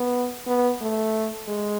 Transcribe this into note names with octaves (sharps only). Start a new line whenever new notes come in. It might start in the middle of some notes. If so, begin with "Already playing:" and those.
Already playing: B3
B3
A3
G#3